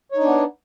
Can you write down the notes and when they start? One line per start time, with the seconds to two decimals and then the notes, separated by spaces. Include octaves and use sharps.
0.12 C#5
0.16 D#4
0.21 D4
0.26 B3